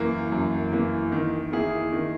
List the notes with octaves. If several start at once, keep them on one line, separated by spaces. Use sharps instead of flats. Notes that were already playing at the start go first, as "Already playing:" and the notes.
Already playing: F#2 E3 A#3
F#2
E3 A#3
D#3
A#3 E4 G#4
D#3